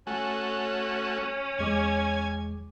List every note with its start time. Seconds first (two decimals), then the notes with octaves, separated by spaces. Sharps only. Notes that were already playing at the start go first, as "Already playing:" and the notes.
0.07 A3 C#4 F#4 G#5
1.59 E2 G#3 G#5 D6